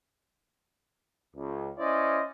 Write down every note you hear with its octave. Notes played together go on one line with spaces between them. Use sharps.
C#2
C#4 E4 C5 D5 D#5